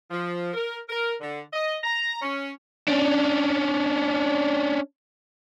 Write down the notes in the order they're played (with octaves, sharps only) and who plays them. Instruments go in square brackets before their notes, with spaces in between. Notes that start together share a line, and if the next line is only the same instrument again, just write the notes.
[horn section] F3
A#4
A#4
D3
D#5
A#5
C#4
[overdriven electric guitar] C#4 D4